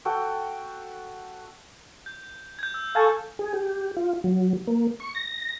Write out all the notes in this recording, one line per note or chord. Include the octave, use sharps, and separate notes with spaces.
F#4 A4 G5
G6
G6 G#6
E6
A4 F5 G#5 A5 C#6
G#4
G4
F4
F#3
A#3
C#6
A#6